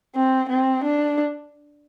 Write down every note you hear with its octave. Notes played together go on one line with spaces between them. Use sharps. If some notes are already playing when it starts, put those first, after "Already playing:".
C4
C4
D4